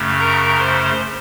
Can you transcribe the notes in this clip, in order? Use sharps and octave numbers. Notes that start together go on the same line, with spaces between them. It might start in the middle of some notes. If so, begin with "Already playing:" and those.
Already playing: F#2 C#3 A3
A#4 A#5
C5 C6